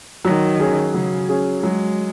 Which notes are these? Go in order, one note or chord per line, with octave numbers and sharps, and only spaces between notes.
D#3 F#3
C#4 G#4
C#3 F#3
C#4 G#4
F#3 G#3